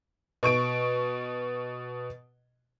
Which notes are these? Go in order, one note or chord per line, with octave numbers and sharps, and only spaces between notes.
B2 C#6 D7